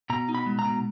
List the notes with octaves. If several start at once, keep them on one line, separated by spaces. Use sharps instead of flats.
B2 A#5
D#4
B5
G#3
A#5
B2